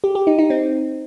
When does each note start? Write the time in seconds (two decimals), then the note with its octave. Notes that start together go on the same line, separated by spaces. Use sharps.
0.04 G4
0.15 G4
0.27 D#4
0.39 D#4
0.50 C4